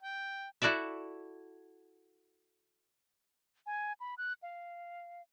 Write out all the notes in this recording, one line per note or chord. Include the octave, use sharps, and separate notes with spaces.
G5
E4 F#4 A4 D5 E5
G#5
B5
F#6
F5